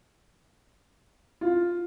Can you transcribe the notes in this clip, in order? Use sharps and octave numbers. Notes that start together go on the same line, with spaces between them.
F4